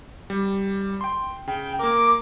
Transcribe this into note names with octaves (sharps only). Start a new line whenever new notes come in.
G3
G5 C6
C#3 G5
A#3 A#4 D6